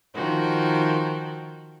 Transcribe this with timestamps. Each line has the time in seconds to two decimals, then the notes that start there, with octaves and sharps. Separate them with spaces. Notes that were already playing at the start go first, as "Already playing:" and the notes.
0.14 D#3 F3 F#4 G5